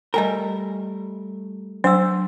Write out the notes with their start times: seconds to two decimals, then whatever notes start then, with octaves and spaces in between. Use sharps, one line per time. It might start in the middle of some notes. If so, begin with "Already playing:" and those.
0.14 G3 A3 A#4 D#5 G#5 A#5
1.84 F#3 D4 C5 E6